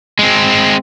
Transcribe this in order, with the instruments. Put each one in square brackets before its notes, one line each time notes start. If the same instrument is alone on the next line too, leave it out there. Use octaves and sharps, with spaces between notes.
[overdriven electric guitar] G#3 C4